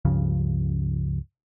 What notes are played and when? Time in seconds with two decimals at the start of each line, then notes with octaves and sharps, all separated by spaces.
0.05 C#2 G2 C#3 F3